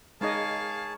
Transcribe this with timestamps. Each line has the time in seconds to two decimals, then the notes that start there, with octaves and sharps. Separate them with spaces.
0.21 G#3 D#4 G#4 A#4 C#5 D#5 F5 A5